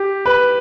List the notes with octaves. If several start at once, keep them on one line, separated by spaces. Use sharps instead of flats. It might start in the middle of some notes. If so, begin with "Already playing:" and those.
Already playing: G4
B4